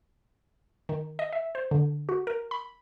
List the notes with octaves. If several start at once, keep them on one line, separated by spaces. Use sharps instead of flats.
D#3
D#5
E5
C5
D3
F#4
A#4
B5